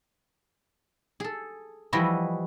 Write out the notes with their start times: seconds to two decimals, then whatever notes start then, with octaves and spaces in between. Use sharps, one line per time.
1.20 G#4 A4
1.93 E3 F3 G3 E4 F#4 D#5